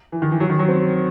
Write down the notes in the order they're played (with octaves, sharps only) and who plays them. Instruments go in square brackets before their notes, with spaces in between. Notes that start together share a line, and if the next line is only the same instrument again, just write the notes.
[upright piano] E3
D#3
E3
F#3
D#3
F#3
C4